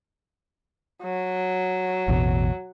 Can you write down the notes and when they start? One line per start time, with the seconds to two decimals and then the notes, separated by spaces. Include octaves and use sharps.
1.03 F#3
2.08 A1 E2 B2